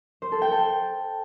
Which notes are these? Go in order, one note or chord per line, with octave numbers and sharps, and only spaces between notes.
C5
A4
G5
A4